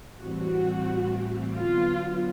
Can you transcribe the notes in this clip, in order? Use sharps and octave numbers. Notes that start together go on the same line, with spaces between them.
A2 E3 G3 C4 F#4
D3 F#3 B3 F4